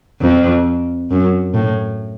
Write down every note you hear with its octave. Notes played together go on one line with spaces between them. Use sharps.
F2
F#2
A2